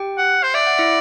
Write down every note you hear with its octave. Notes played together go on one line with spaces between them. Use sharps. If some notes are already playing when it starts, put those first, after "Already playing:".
Already playing: G4 G5
F#5
C5
D5 E5
F#5
E4 E5